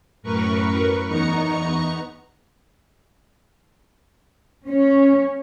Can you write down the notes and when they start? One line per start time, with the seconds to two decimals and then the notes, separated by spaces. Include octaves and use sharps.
0.23 F#2 A2 A#4 B4 C#6
1.07 E2 B3 D#4 A#5 C#6 C#7
4.67 C#4